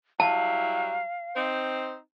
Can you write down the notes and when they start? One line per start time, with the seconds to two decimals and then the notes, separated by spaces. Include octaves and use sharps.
0.20 F#3 G3 E4 F5 A5
1.36 C4 D#4 C5